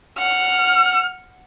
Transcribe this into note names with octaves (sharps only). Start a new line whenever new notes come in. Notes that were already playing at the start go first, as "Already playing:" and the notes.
F#5 F6